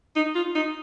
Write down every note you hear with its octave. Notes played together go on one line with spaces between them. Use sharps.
D#4
F4
D#4